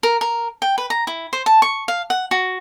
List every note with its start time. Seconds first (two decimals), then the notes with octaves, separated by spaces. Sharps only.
0.03 A#4
0.21 A#4
0.62 G5
0.78 B4
0.90 A#5
1.07 E4
1.33 C5
1.46 A5
1.62 C#6
1.88 F5
2.10 F#5
2.31 F#4